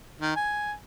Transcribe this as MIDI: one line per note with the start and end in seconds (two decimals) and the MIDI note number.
0.21 0.34 51
0.36 0.73 80